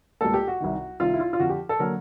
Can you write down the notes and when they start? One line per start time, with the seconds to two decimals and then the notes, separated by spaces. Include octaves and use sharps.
0.21 C#2 B2 G3 A#3 A4
0.34 G4
0.47 F#4
0.60 C2 C3 D#3
1.00 C2 C3 D#3 F4
1.14 E4
1.20 F4
1.33 F4
1.39 F2 D3 F3 F#4
1.49 G4
1.69 A4
1.79 D3 F#3 A#3 A#4